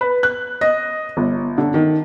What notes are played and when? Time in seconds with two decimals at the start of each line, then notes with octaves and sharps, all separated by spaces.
0.01 B4
0.23 F#6
0.61 D#5
1.17 G1
1.58 D3
1.74 D#3